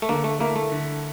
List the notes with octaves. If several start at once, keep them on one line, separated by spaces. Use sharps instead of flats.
A3
D3 A#3
A3
A3 A#3 E4 A#4
A3
D3